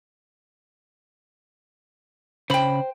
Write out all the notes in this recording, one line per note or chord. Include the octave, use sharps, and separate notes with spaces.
C#3 C5 G5 B5